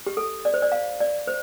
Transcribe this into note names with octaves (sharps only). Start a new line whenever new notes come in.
G4
A4
D5
C5
D5
F5
D5
C5